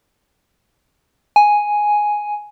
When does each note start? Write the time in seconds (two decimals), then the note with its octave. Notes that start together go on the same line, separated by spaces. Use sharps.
1.36 G#5